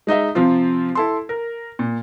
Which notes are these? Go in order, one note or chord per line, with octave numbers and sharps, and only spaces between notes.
G#3 D#4 D#5 E5
C3 F3 C4 F4
E4 A4 C6
A#4
A#2